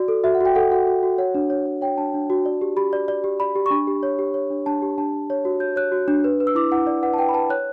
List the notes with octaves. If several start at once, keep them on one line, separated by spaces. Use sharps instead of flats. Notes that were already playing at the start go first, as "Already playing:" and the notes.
Already playing: F#4 D5
A4
F#4 E5
F#5
F#4 G5
A4 F#5
F#4 F#5
F#4
F#4
C#5 F#5
D4
C#5
C#5
C#5 G5
D4 A5
D4
F#4
D5
G4
G4 B5
D5
D5
G4
D5 B5
G4
C#6
D4 B5
G4
C#5
G4
C#5
D4
D4 A5
G4
D4 A5
D4
C#5
F#4
C#5 G6
C#5 F#6
F#4
D4
B4
B4
E6
E4 D6
E4 F#5
D5
B4 F#5
A5
B4 G5
B5
B4 A5
C#5 F#6